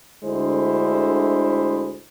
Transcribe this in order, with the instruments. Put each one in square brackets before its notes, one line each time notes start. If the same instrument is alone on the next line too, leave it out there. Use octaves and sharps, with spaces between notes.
[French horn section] D2 D3 G#3 E4 C5